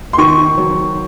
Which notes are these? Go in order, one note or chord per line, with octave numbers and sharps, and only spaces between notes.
C6
D#3 C#6
F#3